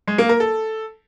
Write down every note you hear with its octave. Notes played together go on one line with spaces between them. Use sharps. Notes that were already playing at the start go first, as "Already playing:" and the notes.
G#3
A#3
A#4
A4